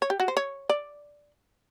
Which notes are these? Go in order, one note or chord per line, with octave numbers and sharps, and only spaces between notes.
C#5
G4
F#4
C5
C#5
D5